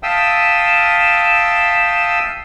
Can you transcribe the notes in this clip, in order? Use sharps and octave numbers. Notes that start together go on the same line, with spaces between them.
E5 F5 G5 A5 D#6 E6